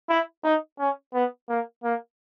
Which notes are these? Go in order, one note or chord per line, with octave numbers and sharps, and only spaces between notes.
E4
D#4
C#4
B3
A#3
A#3